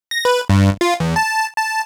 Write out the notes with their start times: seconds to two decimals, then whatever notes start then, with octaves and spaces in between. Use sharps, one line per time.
0.11 A#6
0.25 B4
0.50 G2
0.81 F4
1.00 E2
1.16 A5
1.56 A5